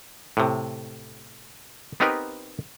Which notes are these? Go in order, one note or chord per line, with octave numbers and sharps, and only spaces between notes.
A2 C3
B3 C4 D#4 G4 A#4 B4